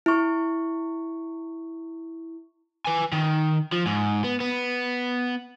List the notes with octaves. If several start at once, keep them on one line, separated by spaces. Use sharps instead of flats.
E4 C#6
B4 G#5
D#3
F3
G#2
B3
B3